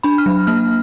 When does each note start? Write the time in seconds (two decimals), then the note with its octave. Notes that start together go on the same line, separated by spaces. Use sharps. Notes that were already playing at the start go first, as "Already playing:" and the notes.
0.03 D4 B5
0.18 F6
0.26 F#3
0.47 A#3 F6